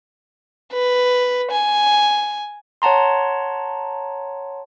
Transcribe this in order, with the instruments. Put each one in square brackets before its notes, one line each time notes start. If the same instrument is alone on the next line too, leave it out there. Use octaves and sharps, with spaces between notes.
[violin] B4
G#5
[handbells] C#5 F#5 A5 A#5 C6